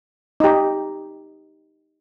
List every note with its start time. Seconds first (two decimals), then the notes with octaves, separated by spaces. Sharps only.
0.40 D#4 G4